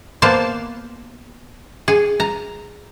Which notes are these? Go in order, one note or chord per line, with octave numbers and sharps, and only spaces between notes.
A#3 B3 C5 D5 A5
G#4
A#5